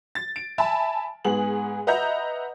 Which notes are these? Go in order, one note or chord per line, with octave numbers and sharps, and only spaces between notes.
A6
D7
E5 G#5 A5 B5
G#2 B3 G#4 F#7
B4 D#5 E5 F#5 A#5 G6